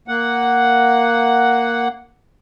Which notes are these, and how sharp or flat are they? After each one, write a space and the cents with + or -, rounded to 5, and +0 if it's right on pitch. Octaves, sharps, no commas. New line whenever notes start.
A#3 +0 F#5 +0